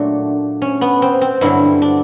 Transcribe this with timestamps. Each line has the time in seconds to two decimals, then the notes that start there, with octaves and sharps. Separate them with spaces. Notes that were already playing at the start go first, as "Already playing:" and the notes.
Already playing: A#2 F#3 A3 D4
0.62 C#4
0.81 B3
1.02 C4
1.21 C4
1.41 G2 D3 F#3 E4
1.82 D4